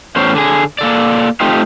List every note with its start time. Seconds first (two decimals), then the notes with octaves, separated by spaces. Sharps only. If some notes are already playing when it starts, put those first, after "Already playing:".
0.16 E2 A2 C#4 C5
0.35 D3 G#4
0.79 A#3 A4 D5
1.41 A3 C4 D#4 F4 G4